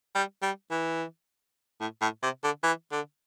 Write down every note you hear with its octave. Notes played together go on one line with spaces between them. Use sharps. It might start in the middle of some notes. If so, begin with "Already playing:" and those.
G3
G3
E3
A2
A2
C3
D3
E3
D3